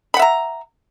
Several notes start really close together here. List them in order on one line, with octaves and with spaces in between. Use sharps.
B5 F#5 E5 A#5